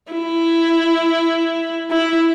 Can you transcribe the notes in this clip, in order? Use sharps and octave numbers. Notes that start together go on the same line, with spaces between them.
E4
E4